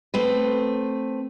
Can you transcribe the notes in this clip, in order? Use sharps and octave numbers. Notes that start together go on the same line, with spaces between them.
A3 C4 B4